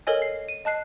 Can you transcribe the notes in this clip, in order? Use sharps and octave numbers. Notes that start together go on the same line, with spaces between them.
A4 A#4 C#5 D#5 G#5
C7
D#7
D#5 A5 F#6 C7